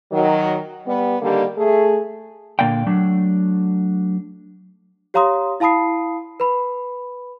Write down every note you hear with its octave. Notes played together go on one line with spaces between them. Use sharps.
D#3 F#3
G3 B3
D3 D#3 G3 A#3
A3 G#4
A#2 D3 A#3 D5 F5 G5
F#3 A3 D4
G4 C#5 F5 A#5 C6 D#6
E4 F5 A5 B5 D#6 C7
B4 B5